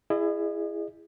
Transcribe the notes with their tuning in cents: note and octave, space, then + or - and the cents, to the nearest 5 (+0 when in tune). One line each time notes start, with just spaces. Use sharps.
E4 +20 G#4 -10 D#5 -35